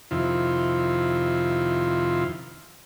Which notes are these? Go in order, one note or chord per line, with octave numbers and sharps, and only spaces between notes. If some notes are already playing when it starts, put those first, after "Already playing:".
F2 C3 D#3 E4 F4